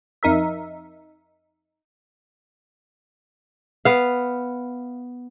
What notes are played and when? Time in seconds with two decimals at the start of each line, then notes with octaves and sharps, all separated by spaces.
0.23 F2 D#4 A#4 E5
3.85 B3 F5